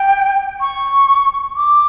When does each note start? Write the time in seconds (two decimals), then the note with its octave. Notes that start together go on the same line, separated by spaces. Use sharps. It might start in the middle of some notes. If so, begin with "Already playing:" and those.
Already playing: G5
0.61 C#6
1.56 D6